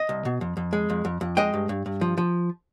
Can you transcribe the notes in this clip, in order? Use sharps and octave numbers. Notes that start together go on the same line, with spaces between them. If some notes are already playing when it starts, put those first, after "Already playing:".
Already playing: D#5
C2
B2
F2
F2
G#3
F2
F2
F2
G#3 D#5 G5
G2
G2
G2
F3
F3